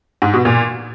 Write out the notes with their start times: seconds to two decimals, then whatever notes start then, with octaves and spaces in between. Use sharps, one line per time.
0.22 G#2
0.34 B2
0.45 A#2